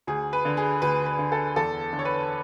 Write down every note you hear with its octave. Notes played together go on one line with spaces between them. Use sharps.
D2 G#4
B4
D3
G#4
D2 B4
B4
D3
A4
E2 A4
D3
C#5
B4